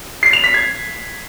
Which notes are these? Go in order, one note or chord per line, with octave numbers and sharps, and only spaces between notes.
C7
F7
B6
G#6